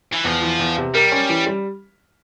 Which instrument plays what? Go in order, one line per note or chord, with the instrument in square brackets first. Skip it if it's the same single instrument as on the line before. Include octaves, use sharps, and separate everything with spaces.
[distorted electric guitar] E3
[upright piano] E2 [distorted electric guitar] F3
[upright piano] E3
E2
C3
[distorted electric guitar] G3 [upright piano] A#4
[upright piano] C#4
E3
G3